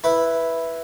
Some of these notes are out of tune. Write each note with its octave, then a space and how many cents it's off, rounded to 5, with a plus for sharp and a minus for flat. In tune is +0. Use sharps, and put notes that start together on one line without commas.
E4 +0 B4 +0